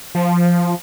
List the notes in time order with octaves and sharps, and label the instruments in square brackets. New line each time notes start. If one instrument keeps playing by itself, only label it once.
[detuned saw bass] F3